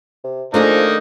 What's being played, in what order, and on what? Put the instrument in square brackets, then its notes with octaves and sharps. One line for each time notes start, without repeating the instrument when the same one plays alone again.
[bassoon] C3
[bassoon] F3 [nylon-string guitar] A3 D4 G#4 [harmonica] A#3 D#4 A#4